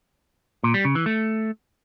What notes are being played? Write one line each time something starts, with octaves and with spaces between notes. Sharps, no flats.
A#2
G3
C#3
E3
A3